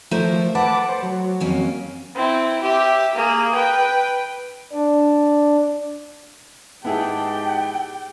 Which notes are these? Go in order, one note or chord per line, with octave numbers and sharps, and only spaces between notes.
F3 A3 A#4 C5
B4 F#5 A5 D6
C5
F#3
F2 A#3 C#4
C4 E4
G4 E5
A#3 G#4
B4 G5
D4
G#2 B3 D#4 E4 G4 G#4 G5 A5